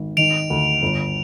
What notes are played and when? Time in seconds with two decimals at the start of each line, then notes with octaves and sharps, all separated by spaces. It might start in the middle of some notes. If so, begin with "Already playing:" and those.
Already playing: G#1
0.17 D#3 D7 F7
0.50 D2
0.82 G1